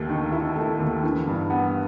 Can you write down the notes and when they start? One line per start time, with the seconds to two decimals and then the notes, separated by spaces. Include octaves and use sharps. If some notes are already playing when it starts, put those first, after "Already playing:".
Already playing: D#2 A3
0.09 D#3
0.32 E4
0.56 A3
0.80 D#2
1.03 E3
1.27 G2
1.50 B3